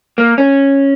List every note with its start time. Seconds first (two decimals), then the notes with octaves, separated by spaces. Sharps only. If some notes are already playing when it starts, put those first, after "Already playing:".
0.18 A#3
0.38 C#4